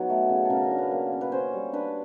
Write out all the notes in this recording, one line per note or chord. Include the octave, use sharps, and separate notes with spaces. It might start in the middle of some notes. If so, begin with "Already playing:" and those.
Already playing: F#3 B3 D#4
A3
C#3
A4
C#3 A#4
A#4
D4
B4
A#3
C#4
B4
C#4 C5
G3
D4 B4